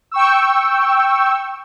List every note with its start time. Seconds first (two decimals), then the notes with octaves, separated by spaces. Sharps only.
0.11 G5 C#6 E6